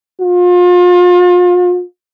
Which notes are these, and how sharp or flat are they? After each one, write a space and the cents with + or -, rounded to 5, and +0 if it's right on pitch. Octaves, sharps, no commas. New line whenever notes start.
F4 +35